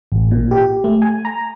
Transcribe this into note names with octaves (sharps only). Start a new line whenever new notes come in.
A1
A#2
G4
A3
G#5
A#5